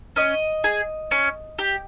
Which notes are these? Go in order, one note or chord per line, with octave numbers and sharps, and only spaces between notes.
C#4 D#5
G#4
C#4
G4